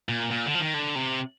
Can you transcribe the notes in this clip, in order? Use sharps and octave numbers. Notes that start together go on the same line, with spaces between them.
A#2
A#2
D3
F3
D#3
D3
C3